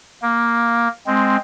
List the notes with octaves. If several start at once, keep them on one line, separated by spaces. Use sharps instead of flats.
A#3
G#3 C4